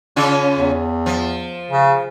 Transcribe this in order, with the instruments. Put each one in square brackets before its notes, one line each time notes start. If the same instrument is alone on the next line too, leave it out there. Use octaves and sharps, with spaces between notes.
[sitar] C#3 C#4 F4
[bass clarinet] E2
[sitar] F3
[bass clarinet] C#3